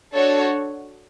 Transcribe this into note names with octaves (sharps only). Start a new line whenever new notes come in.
D4 F#4 A4 C#5